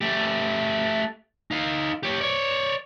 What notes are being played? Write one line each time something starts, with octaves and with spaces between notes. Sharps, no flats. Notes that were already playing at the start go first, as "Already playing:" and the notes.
A3 G4
D#4 F5
G4 C#5
C#5 D5